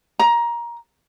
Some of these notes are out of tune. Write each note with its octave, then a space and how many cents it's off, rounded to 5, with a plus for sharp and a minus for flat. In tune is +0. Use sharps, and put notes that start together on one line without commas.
A#5 +20